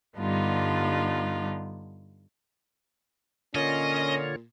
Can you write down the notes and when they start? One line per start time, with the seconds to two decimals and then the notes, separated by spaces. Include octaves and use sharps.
0.17 G2 D3 G3 B3 D#4 F4
3.55 A#2 D3 C#4 F4 C#5 D#5